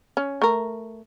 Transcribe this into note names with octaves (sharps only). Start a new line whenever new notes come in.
C#4
A3 A#4